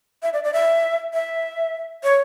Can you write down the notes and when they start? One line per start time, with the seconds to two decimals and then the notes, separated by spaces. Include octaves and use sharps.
0.23 E5
0.33 D5
0.44 D5
0.53 E5
1.14 E5
2.04 C#5